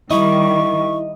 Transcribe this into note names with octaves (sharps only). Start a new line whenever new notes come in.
D#3 G3 E4 D#5 C#6